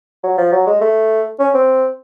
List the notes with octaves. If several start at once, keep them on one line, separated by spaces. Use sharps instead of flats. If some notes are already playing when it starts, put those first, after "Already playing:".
F#3
F3
F#3
G#3
A3
C#4
C4